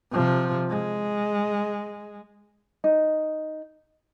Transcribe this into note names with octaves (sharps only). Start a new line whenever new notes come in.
C3 F3
G#3
D#4